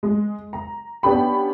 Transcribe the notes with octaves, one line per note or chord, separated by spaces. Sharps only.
G#3
A#5
B3 C#4 D4 G4 B5